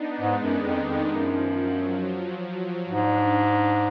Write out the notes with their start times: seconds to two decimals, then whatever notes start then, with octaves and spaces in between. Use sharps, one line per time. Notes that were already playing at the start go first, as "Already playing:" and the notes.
Already playing: B3 D4 D#4
0.20 G#2 G#3
0.42 F#2
0.50 D#3
0.65 F2
0.80 D#3
0.88 F2
1.10 F#2 F3
1.55 F#3
1.99 F3
2.29 F#3
2.59 F#3
2.88 G#2 D4